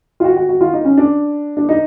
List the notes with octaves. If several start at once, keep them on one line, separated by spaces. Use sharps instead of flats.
F4
F#4
F#4
F#4
F4
D#4
C#4
D4
D4
D#4